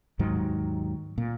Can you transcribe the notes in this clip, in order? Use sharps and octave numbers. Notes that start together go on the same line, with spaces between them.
D#2 G#2 D#3 F#3
A#2